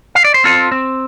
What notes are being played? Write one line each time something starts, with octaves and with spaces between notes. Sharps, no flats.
F5
D5
C5
C4 F4 A4
C4